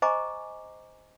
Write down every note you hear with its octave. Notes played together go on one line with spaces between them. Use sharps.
C5 D#5 G#5 A#5 C#6 D6